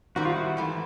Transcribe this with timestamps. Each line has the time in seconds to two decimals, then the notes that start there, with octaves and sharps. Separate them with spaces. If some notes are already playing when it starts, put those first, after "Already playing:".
0.16 D#3 G3 C4 F#4
0.25 F4
0.34 E4 F#4
0.57 G#2 E3 A3